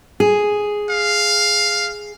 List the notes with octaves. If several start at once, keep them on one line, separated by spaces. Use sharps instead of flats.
G#4
F5